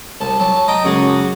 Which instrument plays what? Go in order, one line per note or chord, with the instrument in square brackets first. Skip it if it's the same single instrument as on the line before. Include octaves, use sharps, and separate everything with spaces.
[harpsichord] C2 [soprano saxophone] A5
[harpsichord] F#3 [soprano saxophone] A5
[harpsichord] D#5 G5 [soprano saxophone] A#5
[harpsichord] C#2 G#4 A5 [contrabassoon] F#2 [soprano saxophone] F#4